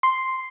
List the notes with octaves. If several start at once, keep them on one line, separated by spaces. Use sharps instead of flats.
C6